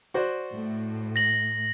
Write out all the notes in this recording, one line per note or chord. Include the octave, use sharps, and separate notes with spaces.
F#4 C5 D5
A2
A#6 F#7